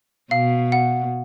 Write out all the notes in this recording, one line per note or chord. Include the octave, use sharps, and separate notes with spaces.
B2 F5
F#5